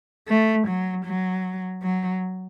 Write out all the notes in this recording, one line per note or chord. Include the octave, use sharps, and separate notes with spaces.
A3
F#3
F#3
F#3